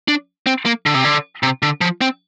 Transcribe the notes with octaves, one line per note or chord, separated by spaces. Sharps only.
D4
C4
A#3
D3
C3
D3
C3
D3
F3
C4